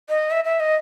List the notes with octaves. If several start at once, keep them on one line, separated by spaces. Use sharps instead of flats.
D#5
E5
E5
D#5